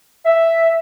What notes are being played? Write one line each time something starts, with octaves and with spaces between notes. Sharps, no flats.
E5